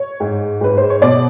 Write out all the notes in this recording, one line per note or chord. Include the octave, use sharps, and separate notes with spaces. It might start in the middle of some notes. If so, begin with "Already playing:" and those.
Already playing: C#5
G#2
G#2 B4
C5
C#5
B2 D5